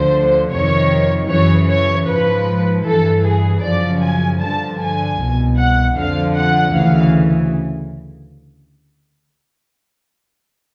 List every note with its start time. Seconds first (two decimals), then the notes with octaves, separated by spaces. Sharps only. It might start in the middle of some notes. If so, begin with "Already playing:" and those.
Already playing: D2 D3 F3 C5
0.52 F2 C3 D#3 C#5
1.30 F#2 C#3 E3 C#5
1.69 C#5
2.08 G#2 F3 B4
2.86 G2 E3 A4
3.24 G#4
3.63 F#2 C#3 F3 D5
4.02 G#5
4.41 G2 D3 F3 A5
4.79 G#5
5.19 C2 B2
5.58 F#5
5.96 F2 D3 F3 F5
6.35 F#5
6.74 D2 C#3 E3 F5